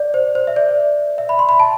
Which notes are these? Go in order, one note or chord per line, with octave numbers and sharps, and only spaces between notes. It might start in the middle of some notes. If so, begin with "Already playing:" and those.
Already playing: D5
C5
C5
E5
D5
E5
B5
C6
B5
A5